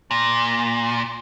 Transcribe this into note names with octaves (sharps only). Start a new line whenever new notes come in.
A#2